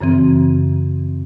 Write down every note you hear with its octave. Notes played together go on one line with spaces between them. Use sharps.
F#2 C#3 E3 C4